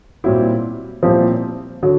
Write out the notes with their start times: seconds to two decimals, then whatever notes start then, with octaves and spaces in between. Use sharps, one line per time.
0.24 A#2 F#3 G3 C4 E4 G4
1.03 A#2 F3 G3 C4 E4 G4
1.82 D3 F#3